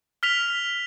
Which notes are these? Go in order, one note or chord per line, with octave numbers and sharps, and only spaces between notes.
F6 B6 F7